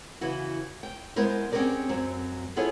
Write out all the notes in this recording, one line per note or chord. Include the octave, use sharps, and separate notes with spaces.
C#3 E3 E4 F#4
G5
G#3 B3 E4 A#4 C5
C4 C#4 G4 G#4 A#4 D5
F#2 F#3 C4
B3 E4 F4 G#4 A4 C#5